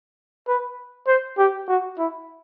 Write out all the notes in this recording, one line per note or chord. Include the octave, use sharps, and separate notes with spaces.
B4
C5
G4
F#4
E4